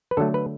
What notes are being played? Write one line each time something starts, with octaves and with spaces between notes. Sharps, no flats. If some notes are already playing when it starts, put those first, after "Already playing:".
B4
D3 F#3 A3 A4
B4